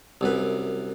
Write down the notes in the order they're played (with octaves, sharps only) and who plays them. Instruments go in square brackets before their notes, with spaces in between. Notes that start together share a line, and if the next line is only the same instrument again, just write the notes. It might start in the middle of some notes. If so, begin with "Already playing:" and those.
[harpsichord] C2 F#2 B4